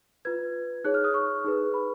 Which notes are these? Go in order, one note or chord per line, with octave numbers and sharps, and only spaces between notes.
F4 B4 G#6
D#4 G#4 C#5 F#6
F6
D#6
C#6
D#4 G#4 B4
B5